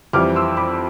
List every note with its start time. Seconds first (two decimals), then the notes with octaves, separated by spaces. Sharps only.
0.13 F2 E3 G3 C4 D6 F6
0.35 C6 E6
0.57 B5 D6